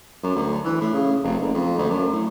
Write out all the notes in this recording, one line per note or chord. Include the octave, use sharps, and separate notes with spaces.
F#2
D2
E3
A2
C#3
F1
F#1
F2
D2
F#2
A2